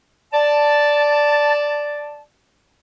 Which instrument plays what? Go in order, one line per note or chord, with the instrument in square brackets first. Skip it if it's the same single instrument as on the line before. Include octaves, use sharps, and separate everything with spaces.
[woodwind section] D5 A5